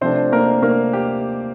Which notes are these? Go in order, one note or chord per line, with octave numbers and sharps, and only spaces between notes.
C3 F3 A3 C4 D4 C5
A#3 A#4
A#3 A#4
G4